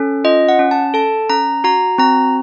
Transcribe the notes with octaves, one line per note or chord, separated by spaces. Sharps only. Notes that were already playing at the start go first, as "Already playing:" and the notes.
Already playing: C#4 A4
F4 D#5
F#5
C#4
A5
A4 A5
C#4 A#5
F#4 A#5
C4 A#5